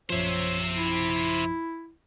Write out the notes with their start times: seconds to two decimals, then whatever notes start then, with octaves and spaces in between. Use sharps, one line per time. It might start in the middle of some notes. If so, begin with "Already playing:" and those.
0.10 A#1 F#2 F3 C5 C#5 E5
0.75 E4